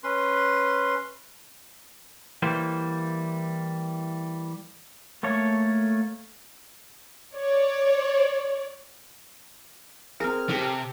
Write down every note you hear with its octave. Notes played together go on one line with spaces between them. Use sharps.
C#4 B4 C6
E3 G3 A#3 C5
A3 A#3 A4 C#5
C#5 D5
C4 G#4 A#4 F6
C3 G4 A4